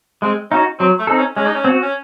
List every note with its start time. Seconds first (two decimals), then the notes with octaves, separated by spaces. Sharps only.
0.22 G#3 C4
0.51 C#4 D#4 F#4
0.79 F#3 C4
0.99 A3
1.07 C4 D#4 A4
1.18 C#4
1.36 G#3 C#4
1.46 D#4
1.55 C#4
1.64 C4 F#4
1.82 C#4